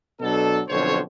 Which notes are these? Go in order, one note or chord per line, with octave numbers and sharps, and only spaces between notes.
B2 F#3 D4 A4
B1 F2 D3 C5 C#5